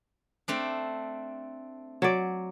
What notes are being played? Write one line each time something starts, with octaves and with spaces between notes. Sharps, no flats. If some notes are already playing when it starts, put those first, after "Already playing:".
A3 C4 D4
F#3 D5